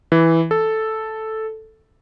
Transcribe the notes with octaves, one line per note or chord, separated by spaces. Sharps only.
E3
A4